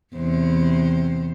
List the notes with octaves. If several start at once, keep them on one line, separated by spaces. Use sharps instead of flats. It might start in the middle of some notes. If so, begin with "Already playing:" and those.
E2 C3 C5